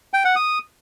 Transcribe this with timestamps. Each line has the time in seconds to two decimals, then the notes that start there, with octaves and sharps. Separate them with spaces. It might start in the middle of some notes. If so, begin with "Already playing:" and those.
0.14 G5
0.25 F#5
0.36 D#6